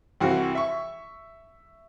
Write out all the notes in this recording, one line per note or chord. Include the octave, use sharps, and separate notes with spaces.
C2 E3 F#4 F5
E5 C#6